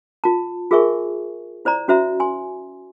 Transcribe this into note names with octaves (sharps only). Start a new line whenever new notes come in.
F4 A5
F4 G#4 A#4 E5 G#5 C#6
E4 C5 D5 A#5
C#4 F#4 C5 E5 A#5
G#5 C6